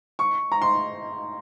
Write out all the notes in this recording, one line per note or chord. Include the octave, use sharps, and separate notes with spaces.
C#6
A#5
C6